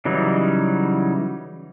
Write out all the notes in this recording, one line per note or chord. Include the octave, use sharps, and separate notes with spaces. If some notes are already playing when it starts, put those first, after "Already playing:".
C#3 E3 F#3 G3 D#4